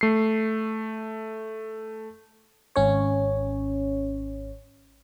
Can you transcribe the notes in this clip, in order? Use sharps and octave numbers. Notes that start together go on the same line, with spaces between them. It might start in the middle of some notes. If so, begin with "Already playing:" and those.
A3 C7
G#1 C#4 C#5